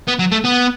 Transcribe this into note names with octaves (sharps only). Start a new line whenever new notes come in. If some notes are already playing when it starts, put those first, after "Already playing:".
B3
F#3
A3
B3